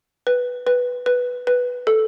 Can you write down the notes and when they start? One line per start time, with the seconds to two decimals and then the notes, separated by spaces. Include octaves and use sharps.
0.27 B4
0.67 B4
1.06 B4
1.47 B4
1.87 A4